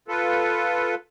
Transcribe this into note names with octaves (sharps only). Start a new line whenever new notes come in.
F4 A4 B4